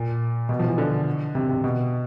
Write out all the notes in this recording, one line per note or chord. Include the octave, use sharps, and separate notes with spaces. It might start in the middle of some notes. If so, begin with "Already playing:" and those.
Already playing: A#2
B2
F3
E3
D3
C3
C3
B2